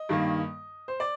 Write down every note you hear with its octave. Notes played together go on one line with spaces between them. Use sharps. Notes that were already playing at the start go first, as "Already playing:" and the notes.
Already playing: D#5
G2 D#3 A#3
C5
D5